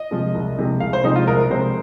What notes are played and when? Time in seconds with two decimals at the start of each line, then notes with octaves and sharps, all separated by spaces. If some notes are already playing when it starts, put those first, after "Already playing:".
Already playing: D#5
0.11 C3 F3 G#3
0.34 C2
0.58 C3 F3 G#3
0.80 C2 F5
0.93 C5
1.04 C3 F3 G#3 D#4
1.16 F4
1.27 C2 A#4
1.50 C3 F3 G#3 C5